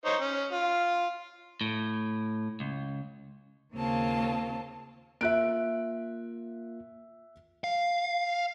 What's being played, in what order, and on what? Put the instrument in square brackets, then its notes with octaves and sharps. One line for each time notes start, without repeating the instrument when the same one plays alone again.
[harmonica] D#4 C5 C#5
C#4
F4
[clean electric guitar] A2
C#2
[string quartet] D#2 C#3 A#3 C4 F4 A5
[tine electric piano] A#3 F4 [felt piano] E5 F#6 D7
[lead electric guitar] F5